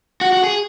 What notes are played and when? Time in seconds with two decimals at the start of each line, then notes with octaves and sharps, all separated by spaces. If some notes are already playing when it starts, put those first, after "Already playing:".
0.21 F#4
0.33 F#4
0.44 G#4